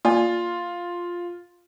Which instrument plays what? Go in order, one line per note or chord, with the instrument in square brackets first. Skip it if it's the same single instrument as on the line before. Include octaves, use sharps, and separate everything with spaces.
[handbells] A#3 D5 G#5 [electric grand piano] F4